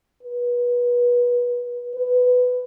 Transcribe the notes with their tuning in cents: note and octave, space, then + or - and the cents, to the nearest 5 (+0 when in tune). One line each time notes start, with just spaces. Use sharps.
B4 -25
B4 +10